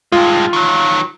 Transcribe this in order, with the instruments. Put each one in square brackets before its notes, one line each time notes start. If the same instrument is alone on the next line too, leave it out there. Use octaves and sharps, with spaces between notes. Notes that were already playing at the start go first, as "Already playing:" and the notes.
[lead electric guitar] G2 G#3 [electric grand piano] F4
[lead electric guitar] D#3 F#3